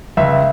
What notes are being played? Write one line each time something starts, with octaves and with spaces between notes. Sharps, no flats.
C#2 E5